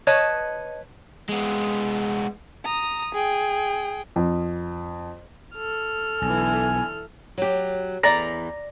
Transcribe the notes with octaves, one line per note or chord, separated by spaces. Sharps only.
B4 C#5 D#5 A5
G#3 B3
A#5 D#6
G#4 G5
F2
A4 F6
B1 D3 E3 G#5
F#3 G4
E2 E3 D5 A#5 A#6